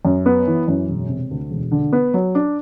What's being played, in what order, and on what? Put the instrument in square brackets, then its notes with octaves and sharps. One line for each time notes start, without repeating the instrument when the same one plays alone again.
[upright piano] F#2
B3
E3
F#2
E1
C3
D2
E1
D3
B3
F#3
D4